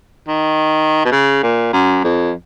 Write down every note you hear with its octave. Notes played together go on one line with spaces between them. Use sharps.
D#3
B2
C#3
A#2
F#2
F2